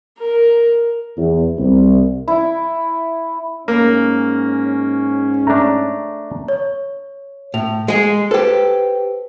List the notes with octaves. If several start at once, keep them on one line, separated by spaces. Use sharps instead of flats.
A#4
E2
C2
E4
G#2 A#3 C#4
A3 D4 A#5
C#5
A2 F7
G#3 G#4
G4 A4 B4 C5